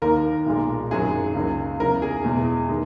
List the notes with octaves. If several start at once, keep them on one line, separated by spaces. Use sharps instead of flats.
D#2 D#3 A#3 A#4
B1 A#2 G#3
G#1 F#2 D#3 F#3 G#4
C#2 C#3 F#3 A#3
E2 C#3 F#3 A#4
G#4
E2 B2 G#3
D#3 G#3